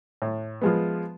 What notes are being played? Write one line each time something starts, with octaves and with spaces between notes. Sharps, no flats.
A2
F3 G#3 B3